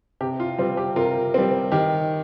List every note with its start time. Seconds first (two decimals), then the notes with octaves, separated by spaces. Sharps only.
0.21 C3 G4
0.40 F4
0.58 G3 C4 F4
0.77 G4
0.96 C3 F4 A#4
1.34 G3 C4
1.72 D#3 G4